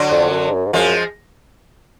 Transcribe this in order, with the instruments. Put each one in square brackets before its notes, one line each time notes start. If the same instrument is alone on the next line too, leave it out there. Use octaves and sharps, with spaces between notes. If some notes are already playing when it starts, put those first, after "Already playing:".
Already playing: [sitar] D3 F#3
[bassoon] F2
F#2
G#2
F#2
G#2
[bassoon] F#2 [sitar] F3 G#3